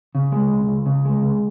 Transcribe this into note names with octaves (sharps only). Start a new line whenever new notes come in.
C#3
G#3
C#2
C#2
C#3
G#3
C#2